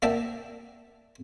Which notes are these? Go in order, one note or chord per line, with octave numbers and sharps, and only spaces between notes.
A#3 D5 E5 F#5 G5 A5